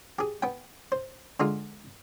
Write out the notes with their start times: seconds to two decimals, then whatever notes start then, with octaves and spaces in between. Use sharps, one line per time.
0.19 G4 G#4
0.42 B3 G5
0.92 C5
1.40 D3 G#3 D#4 F4